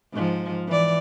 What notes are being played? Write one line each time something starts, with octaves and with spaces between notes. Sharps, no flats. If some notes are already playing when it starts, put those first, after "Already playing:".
G#2 F3
E3 D5